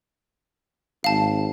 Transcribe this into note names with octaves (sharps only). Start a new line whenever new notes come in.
G#1 F5 A5